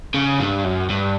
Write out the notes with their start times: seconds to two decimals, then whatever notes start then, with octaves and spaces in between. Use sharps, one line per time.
0.14 C#3
0.40 G2
0.64 F#2
0.90 G2